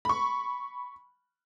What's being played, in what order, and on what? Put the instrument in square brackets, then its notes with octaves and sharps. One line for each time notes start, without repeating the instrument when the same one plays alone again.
[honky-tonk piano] B5 C#6